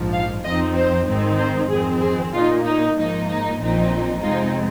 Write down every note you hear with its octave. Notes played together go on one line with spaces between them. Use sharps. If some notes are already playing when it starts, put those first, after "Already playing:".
Already playing: A#1 G#2 F3
F5
F2 F3 C4 D#4 D#5
C5
G#1 G#2 D#3 C4 D#4
C5
F2 D#3 C4 G#4
G#4
A#2 A#3 D#4 F4
D#4
G#2 F3 A#3 D#4
D#4
A#1 A#2 F3 C4 D#4
F2 C3 G#3 C4 D#4 F4